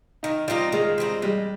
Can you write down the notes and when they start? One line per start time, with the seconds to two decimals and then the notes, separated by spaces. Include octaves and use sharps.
0.23 D#3 D#4
0.48 G3 C4 D#4 F4
0.72 D#3 G#3
0.98 G3 C4 D#4
1.22 G3 G#3